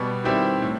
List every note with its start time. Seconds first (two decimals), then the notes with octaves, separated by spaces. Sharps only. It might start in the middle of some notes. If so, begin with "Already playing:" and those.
Already playing: B2 G3 B3
0.24 D#3 G3 C4 E4 G4
0.62 A2